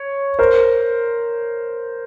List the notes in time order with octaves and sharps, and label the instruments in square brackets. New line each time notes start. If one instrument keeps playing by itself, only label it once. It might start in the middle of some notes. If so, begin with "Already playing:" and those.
Already playing: [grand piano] C#5
A#4 C5